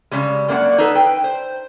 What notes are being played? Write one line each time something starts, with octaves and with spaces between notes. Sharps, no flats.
C#3 G3 G#3
F#2 A#3 C4 D4 D5 F#5
D#4 G#4 A4 B4
B4 G5
C5